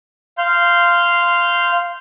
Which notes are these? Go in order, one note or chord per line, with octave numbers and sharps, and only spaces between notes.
F5 C6 G6